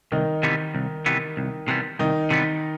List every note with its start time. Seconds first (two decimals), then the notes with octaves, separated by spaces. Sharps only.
0.12 C2 D#3 D#4
0.43 C3 E3 G3 B3
0.75 C2
1.06 C3 E3 G3 B3
1.37 C2
1.68 C3 E3 G3 B3
1.99 C2 D#3 D#4
2.30 C3 E3 G3 B3